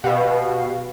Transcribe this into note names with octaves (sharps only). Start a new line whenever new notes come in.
B2 G4 B4 F5